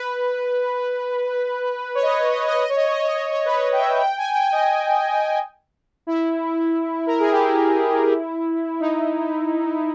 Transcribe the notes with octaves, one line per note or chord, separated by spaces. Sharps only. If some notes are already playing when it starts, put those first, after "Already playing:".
Already playing: B4
C#5
D#5
C#5
D#5
C#5
D#5
C#5
D#5
C#5
D#5
C#5
D#5
C#5
D#5
C#5
D#5
C#5
C#5
B4
C#5
G5
E5
G5
G#5
G5
D#5
E4
A#4
G#4
G4
E4
D#4